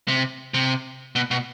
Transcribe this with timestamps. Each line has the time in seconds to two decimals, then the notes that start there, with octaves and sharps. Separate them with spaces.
0.08 C3
0.54 C3
1.16 B2
1.31 B2